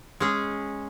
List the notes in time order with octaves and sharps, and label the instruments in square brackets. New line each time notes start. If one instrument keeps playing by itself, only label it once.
[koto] G#3 C#4 G#4